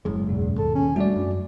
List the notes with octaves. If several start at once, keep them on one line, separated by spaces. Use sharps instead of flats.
F#1 F#2 A2 G#3
E2 G#2 B2
D#2 A4
C#4
G3 A3 D4 F#4 D5
F#2